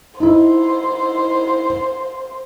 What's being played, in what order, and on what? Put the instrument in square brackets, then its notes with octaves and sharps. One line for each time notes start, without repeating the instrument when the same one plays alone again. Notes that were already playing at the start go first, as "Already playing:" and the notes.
[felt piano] D#4 E4 [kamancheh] C5